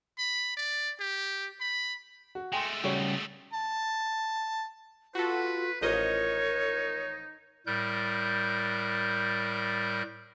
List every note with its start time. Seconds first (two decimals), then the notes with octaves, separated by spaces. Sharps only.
0.18 B5
0.57 D5
1.00 G4
1.60 B5
2.35 F#4
2.52 G#3 A3 G5 G#5 C6
2.84 C#3 G3 F#4 G4 C#5
3.53 A5
5.15 F4 F#4 A4 B4
5.81 A1 F3 D#4 A#4 C#5 D#5
7.67 A2 G3 A#4 F#6 G6